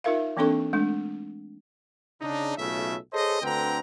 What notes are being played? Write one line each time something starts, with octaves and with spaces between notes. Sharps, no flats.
D#4 F4 A#4 E5 F5
E3 A#3 C4 D4 A4 C#6
G#3 A3 D4
C#3 D4 D#4
B1 C#3 A3 F4 E5
G#4 A4 C5 C#5 D#5
D2 D3 C4 B4 G5 A#5